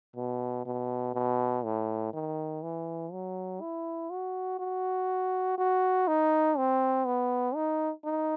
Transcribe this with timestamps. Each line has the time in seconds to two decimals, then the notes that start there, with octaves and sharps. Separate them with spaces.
0.16 B2
0.66 B2
1.15 B2
1.64 A2
2.14 D#3
2.63 E3
3.13 F#3
3.61 E4
4.11 F#4
4.59 F#4
5.58 F#4
6.08 D#4
6.58 C4
7.06 B3
7.55 D#4
8.05 D#4